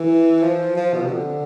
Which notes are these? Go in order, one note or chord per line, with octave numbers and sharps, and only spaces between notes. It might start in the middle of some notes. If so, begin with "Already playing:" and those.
Already playing: E3
F3
F3
B2
C3
D3